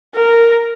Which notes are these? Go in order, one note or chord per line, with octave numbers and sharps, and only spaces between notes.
A#4